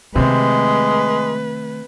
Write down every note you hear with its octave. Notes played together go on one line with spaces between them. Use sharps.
C3 D#3 G#3 A3 B4